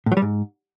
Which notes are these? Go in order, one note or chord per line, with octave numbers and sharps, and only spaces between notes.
A2
F#3
G3
G#2